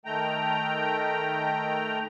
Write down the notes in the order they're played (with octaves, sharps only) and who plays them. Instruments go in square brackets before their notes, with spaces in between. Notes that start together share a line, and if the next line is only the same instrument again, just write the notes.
[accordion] D#3 A3 G5 A#5